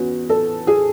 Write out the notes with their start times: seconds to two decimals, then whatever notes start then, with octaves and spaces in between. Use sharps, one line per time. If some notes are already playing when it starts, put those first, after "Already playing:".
Already playing: E2 C#4 F#4
0.29 A4
0.67 G#4